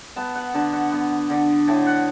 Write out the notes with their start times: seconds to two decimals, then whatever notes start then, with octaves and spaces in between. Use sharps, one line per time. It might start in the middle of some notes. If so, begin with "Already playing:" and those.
0.16 B3 A5
0.35 F#5
0.54 D3 A5
0.73 F#5
0.92 B3
1.30 D3
1.67 A2 A5
1.86 F#5